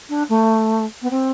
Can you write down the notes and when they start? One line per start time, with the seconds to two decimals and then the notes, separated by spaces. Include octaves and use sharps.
0.09 D4
0.29 A3
1.02 B3
1.10 C4